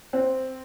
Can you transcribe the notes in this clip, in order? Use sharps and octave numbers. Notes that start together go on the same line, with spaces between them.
C4